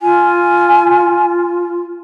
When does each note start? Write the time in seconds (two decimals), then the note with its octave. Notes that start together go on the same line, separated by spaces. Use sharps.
0.01 F4 G#5